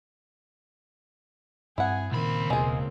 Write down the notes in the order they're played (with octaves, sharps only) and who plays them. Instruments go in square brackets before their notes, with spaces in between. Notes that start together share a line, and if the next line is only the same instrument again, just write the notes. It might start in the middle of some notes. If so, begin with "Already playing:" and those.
[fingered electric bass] G2 C4 [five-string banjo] E4 F#5 [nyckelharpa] G#4
[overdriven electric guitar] C#2 B5 [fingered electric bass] A#2 D#3 [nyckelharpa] A#3 C4
[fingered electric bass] D#1 B2 [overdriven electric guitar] C#2 [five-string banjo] G#3 G#4